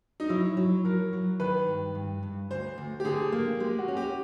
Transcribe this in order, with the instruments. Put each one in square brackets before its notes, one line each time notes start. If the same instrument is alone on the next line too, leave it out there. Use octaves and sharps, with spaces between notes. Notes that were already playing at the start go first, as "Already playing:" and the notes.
[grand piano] D#4
[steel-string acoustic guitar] F#3 [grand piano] E4
[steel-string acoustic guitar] F#3
[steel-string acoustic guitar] F#3 [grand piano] A#4
[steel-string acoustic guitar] F#3
[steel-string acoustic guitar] D#3 [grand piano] B4
[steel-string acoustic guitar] G2
G2
G2
[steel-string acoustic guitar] D2 [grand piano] C5
[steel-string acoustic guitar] D2
[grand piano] G4
[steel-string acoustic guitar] D3 [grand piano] G#4
[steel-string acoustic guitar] A#3
[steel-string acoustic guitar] G#3 [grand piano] G4
[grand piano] F#4
[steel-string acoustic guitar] C#4
[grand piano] G4